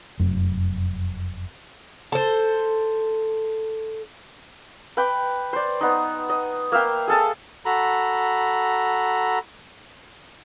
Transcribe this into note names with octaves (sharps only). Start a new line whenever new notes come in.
F1 F#2
A4 C5
B4 G5 D6
C5 D5
B3 D#4
D#5
A#3 E5 F5 G5
G#4 A4 A5
F#4 A4 A#5 B5